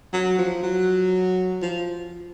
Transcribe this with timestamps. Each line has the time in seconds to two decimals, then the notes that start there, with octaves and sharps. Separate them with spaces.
0.13 F#3
0.38 F3
0.63 F#3
1.62 F3